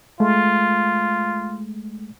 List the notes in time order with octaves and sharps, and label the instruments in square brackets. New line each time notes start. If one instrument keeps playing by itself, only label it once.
[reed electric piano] G#3 A3 [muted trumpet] F4